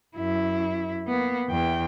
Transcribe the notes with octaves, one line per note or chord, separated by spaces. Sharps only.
F#2 E4
A#3 B3
E2 G5